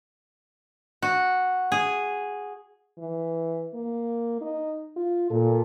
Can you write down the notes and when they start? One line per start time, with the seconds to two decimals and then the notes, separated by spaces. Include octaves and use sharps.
1.02 F#4
1.72 G#4
2.98 E3
3.75 A#3
4.41 D#4
4.96 F4
5.30 A#2 A4